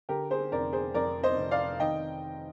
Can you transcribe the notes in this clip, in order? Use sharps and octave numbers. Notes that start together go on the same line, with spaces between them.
D3 G4 A#4
G#4 C5
F1 A#4 D5
G#4 C5
F2 A#4 D5
C5 D#5
F1
D5 F5
D#3 D#5 G5